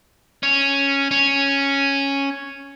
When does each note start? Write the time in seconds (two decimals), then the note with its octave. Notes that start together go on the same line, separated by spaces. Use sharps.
0.43 C#4
1.11 C#4